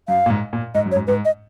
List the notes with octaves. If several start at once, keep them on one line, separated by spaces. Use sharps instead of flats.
F#2 F5
A#2
G#2
A#2
G#2 D#5
F#2
C#5
G#2
G#2 B4
D#5